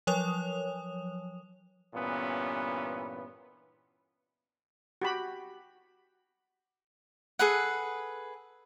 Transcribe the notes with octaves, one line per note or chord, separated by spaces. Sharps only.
F3 F#3 C#5 D#6 F7
G2 A#2 E3 B3 C#4
F#4 G4 B5
G#4 A4 B4 F#5